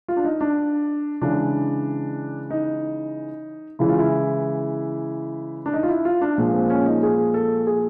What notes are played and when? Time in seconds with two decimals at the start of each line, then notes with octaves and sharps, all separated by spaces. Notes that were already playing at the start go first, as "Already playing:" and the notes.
0.08 F4
0.17 D4
0.24 D#4
0.41 D4
1.21 C#3 E3 G#3 D4
2.50 D#4
3.79 C#3 E3 G#3 E4
3.89 F4
3.99 E4
5.66 D4
5.73 D#4
5.83 F4
5.89 E4
6.05 F4
6.22 D4
6.38 A#2 F3 G#3
6.54 C4
6.70 C#4
6.86 D#4
7.03 G#4
7.34 A4
7.67 G#4